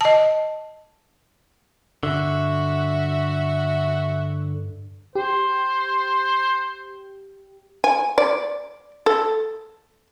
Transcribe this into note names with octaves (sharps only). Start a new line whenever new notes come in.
D#5 A5
G2 D3 F#4 E5
G4 C5
G#5
D5
A4